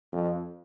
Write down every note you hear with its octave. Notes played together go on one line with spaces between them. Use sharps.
F2